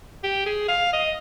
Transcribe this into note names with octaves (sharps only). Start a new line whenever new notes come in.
G4
G#4
F5
D#5